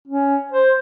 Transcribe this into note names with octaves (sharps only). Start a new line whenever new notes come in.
C#4
C5